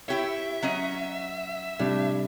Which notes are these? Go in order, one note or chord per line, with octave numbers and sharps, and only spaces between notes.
E4 G4 C#5 E5
F#3 C#4 D#5
A2 C3 G3 D4